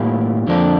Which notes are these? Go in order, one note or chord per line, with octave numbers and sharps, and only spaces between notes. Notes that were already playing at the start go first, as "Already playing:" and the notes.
Already playing: A2 G3 A#3 F4
F2 D3 F3 A#3 D4